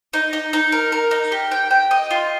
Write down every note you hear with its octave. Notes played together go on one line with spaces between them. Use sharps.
D#4
D#4
D#4
A#4
A#4
D#4
G4
G5
G5
D#5
F4